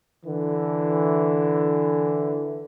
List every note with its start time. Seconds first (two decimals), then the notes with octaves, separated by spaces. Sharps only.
0.24 D3 E3